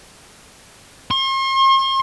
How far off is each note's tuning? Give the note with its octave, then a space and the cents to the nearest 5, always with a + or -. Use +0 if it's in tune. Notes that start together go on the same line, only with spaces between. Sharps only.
C6 +45